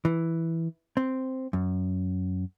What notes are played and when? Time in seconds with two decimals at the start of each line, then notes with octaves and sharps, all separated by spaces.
0.05 E3
0.97 C4
1.53 F#2